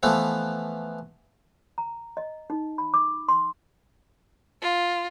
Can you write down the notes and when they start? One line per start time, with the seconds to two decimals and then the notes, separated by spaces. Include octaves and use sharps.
0.03 E3 F3 A3 B3
1.78 A#5
2.17 D#5
2.50 D#4
2.78 B5
2.94 D6
3.29 C6
4.62 F4